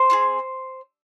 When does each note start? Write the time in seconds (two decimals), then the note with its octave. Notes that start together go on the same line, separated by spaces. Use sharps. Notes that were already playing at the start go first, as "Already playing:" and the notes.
Already playing: C5
0.10 C4 F4 G#4